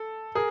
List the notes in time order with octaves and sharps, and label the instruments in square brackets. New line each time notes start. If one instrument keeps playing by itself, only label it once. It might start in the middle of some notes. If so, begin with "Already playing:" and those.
Already playing: [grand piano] A4
G#4 A#4